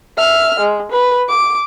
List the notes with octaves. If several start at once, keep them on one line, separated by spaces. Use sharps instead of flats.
E5 F6
G#3
B4
D6